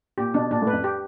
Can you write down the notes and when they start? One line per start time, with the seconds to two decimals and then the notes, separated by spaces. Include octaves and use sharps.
0.18 A#2 G4
0.34 B2 D4
0.51 A#2 D4
0.62 A2
0.67 B4
0.73 F2
0.84 G4